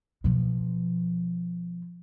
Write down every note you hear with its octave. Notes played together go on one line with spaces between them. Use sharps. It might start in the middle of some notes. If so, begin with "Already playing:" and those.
B2 F3